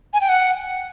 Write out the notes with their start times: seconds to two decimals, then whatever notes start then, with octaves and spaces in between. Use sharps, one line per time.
0.13 G#5
0.21 G5
0.29 F#5